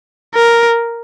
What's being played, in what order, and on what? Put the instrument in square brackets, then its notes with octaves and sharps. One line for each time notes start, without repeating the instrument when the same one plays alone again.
[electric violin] A#4